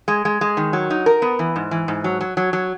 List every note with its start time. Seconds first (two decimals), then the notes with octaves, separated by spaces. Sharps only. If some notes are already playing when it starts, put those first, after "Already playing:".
0.08 G#3
0.25 G#3
0.41 G#3
0.57 D#3
0.73 F#3
0.90 D#4
1.06 A#4
1.22 B3
1.39 E3
1.56 G#2
1.71 E3
1.88 G#2
2.04 F#3
2.21 F#3
2.37 F#3
2.53 F#3